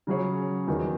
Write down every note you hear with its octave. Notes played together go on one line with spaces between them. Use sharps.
C#3 F#3 C#4 G#4 C#5
E2 D#3 F#3